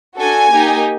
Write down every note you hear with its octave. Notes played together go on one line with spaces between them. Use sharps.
D4 F#4 A4 G#5
A#3 D#4 G4